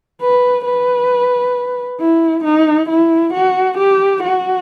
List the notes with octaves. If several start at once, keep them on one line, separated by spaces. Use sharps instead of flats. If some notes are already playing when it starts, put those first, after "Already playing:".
B4
B4
E4
D#4
E4
F#4
G4
F#4